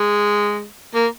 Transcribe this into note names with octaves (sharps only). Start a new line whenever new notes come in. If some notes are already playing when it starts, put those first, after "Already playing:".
Already playing: G#3
A#3